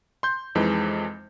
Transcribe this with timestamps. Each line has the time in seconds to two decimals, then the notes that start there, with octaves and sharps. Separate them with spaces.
0.23 C6 G6
0.55 F2 E3 G#3 D#4